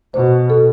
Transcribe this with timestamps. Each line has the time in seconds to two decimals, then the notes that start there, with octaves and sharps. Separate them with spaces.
0.14 B2 C5
0.50 A4